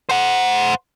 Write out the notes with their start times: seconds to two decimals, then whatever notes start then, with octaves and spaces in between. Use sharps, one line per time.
0.09 C5 F#5